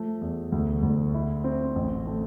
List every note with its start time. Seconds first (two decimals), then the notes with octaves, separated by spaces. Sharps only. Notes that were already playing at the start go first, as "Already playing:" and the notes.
Already playing: F3 A3
0.21 E2
0.52 D2
0.83 D2
1.14 E4
1.44 C4
1.75 A1
2.07 A3